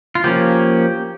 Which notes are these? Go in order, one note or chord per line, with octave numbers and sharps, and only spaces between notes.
F4
F3 A#3 C#4 G4